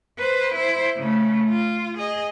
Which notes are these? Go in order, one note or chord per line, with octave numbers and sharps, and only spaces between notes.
B4 C5
E4 C5
C#3 A3
F4
G#4 D#5